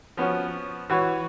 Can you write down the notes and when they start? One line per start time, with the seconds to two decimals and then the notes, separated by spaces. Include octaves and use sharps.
0.17 F3 B3 C#4 F#4
0.90 E3 F#4 B4 C#5